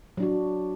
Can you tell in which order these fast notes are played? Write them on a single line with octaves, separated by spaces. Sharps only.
F#3 D4 F#4